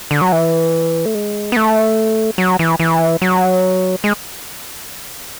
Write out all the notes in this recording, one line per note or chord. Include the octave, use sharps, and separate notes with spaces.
D3
F#3
E3
A3
G#3
B3
A3
F#3
E3
E3
F#3
G#3